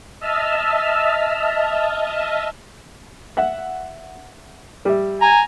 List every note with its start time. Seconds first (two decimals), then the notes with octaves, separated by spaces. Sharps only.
0.20 D#5 E5 A5 E6 F6
3.37 E5 F#5
4.85 G3 E5
5.22 G#5 A#5